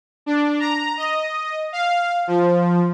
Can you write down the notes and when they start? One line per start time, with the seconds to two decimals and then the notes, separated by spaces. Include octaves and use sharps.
0.26 D4
0.60 A#5
0.97 D#5
1.72 F5
2.27 F3